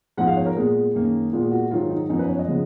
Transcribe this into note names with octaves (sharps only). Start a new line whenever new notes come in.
G#2 F3 B3 F#5
F5
C#5
A#4
A#2 G#3 B3 G#4
F#2 D#3 A#3
A#2 G#3 B3 F4
F#4
G#2 D#3 F#3 F4
D#4
F#2 F3 B3 D#4
B4
C#5
D#5
C#3 F3 G#3 B3